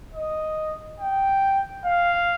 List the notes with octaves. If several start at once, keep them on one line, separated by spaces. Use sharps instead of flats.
D#5
G5
F5